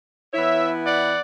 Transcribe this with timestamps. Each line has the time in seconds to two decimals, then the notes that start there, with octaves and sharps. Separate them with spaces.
0.33 E3 B3 E4 C#5 E5
0.84 D5 F#5